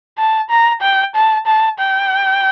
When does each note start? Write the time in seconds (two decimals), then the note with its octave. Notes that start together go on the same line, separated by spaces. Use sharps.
0.18 A5
0.50 A#5
0.82 G5
1.15 A5
1.46 A5
1.79 G5